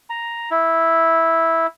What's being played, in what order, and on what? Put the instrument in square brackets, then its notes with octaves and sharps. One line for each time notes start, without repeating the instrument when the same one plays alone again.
[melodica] A#5
E4